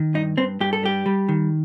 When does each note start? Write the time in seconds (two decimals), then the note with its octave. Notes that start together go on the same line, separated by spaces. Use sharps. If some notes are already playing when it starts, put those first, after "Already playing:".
Already playing: D#3
0.14 G2 D#4
0.37 G2 C4
0.60 G2 G4
0.73 A4
0.83 G3 G4
1.06 G3
1.29 D#3